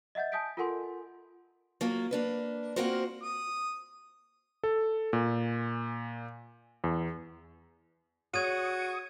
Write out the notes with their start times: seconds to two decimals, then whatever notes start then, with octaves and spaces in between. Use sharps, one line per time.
0.15 D#5 E5 F#5 G6 A6
0.32 G#5 A5 D#6 G6 B6 D7
0.57 F4 A4 A#4 F#5 G#5 C6
1.81 F#3 A#3 F4
2.11 A#3 D4 B4
2.76 A#3 C4 F4 F#4 A#4 C5
3.22 D#6
4.64 A4
5.13 A#2
6.84 E2
8.34 F#4 G#4 C#5 D5 C#6 D#6 G#6 D#7